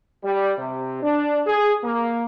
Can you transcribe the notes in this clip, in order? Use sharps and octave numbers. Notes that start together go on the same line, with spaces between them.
G3
C3
D4
G#4
A#3